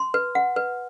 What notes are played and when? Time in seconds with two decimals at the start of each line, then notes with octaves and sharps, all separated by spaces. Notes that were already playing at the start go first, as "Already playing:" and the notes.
Already playing: C6
0.14 B4
0.35 F#5
0.56 B4